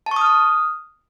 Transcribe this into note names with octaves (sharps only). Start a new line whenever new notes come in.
A5
C#6
D#6
F6
D#6